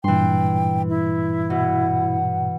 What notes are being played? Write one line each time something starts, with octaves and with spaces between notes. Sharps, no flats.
G2 A#2 E3 G5 C6
E4
B2 F#5